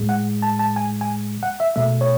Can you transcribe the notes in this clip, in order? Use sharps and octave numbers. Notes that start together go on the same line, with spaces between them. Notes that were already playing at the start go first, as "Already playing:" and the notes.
Already playing: A2 G#3
F#5
A5
A5
G#5
G#5
F#5
E5
B2 A3 E5
C#5